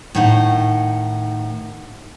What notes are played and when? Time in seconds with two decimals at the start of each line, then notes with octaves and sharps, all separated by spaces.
0.15 A2 D#3 D#4 F#5